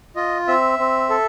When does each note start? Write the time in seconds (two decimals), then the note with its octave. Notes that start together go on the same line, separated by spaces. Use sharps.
0.16 F4 D#5
0.48 C4 E5
0.79 C4
1.10 A4